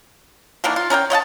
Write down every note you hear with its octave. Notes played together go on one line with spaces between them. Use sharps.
D#3 E3 A#3 D4
F4
C#4 A#4 D5 G5
C#5 D#5 F#5 A5